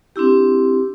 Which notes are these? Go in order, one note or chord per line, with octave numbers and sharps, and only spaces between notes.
C4 D4 E4 G4